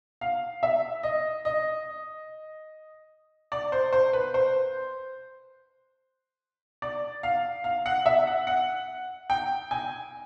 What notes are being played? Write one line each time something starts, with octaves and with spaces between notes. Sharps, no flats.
F5
E5
D#5
D#5
D5
C5
C5
B4
C5
D5
F5
F5
F#5
E5
F#5
F#5
G5
G#5